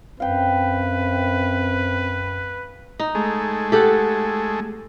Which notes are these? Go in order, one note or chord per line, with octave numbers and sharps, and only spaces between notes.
F#2 C4 B4 F5 G5
D#4
G#3 A3
G4 A4 F#5